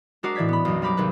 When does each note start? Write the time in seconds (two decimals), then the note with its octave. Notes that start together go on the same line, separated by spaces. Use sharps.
0.23 G#3 D4 F#4 A#4 D6 C7
0.35 A2 E3 D5 G#6 B6
0.49 B3 B5
0.65 B1 F#2
0.82 G3 A#4 B5 D6
0.97 G#1 D#2 C3 B4